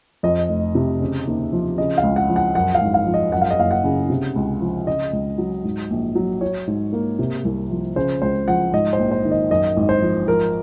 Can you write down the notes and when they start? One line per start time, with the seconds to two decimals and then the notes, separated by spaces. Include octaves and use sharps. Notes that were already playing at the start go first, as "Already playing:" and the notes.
0.23 F2 D#5
0.49 F1
0.75 C3
1.00 C#3
1.27 D#2
1.53 F3
1.78 C#3 D#5
1.98 F5
2.03 C#2
2.16 F#5
2.29 F3
2.36 F#5
2.55 F#2 F#5
2.75 F5
2.81 G#1
2.94 F5
3.07 F3
3.14 D#5
3.32 F#2 F#5
3.42 F5
3.51 D#5
3.58 F#1 F5
3.71 F#5
3.84 C#3
4.10 C3
4.36 C#2
4.61 F3
4.87 C#3 D#5
5.13 C#2
5.38 F#3
5.64 G#2
5.90 A#1
6.15 F#3
6.41 F#3 C#5
6.67 G#2
6.93 A#3
7.19 C3
7.45 C2
7.70 F3
7.96 C#3 C5
8.22 C#2 C5
8.48 F3 F#5
8.73 G#2 D#5
8.93 C5
8.99 A#1
9.11 C5
9.25 D#3
9.31 D#5
9.50 F#2 D#5
9.77 G#1
9.89 C5
10.02 F3
10.27 F3 A#4